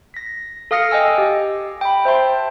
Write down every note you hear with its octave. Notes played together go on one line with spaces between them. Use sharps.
A#6 B6
A4 F5 D#6 F6 A#6 C#7
D#5 G5 G#5 E6
G4
G5 B5
C5 E5 G5 A5 C6